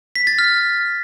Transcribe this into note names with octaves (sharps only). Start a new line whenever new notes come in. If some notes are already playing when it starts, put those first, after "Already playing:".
B6
A6
F6